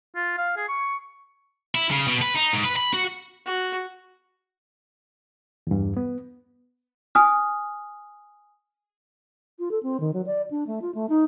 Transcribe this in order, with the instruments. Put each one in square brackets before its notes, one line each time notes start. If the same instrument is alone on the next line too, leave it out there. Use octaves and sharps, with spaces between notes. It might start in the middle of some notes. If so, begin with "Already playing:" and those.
[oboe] F4
F5
G#4
C#6
[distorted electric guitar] E4
C#3
B2
B4
D#4
G#2
B4
B5
F#4
[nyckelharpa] F#4
[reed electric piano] E2 G2
B3
[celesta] G#5 D#6 F6
[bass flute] F4
A4
C4
D#3
F#3
D5
D4
A3
F4
A3
D#4